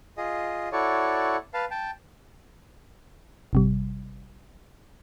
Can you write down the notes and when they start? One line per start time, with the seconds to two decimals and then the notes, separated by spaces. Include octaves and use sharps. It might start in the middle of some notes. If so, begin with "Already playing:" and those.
0.17 F4 G#4 D#5
0.72 E4 F#4 A4 C#5 D5
1.54 B4 F5 A5
1.71 G5 A5
3.53 G#1 C3 G3